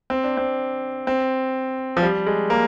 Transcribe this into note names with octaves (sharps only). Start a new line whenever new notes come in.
C4
D4
C4
C4
F3
G3
G#3
A#3